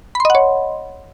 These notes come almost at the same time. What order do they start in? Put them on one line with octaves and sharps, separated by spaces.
B5 C6 D#5 F#5 C#5